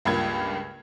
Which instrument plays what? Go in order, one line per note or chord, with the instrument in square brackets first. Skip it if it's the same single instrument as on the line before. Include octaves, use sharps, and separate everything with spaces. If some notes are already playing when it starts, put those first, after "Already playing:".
[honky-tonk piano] C#2 G2 A#3 F4 G#6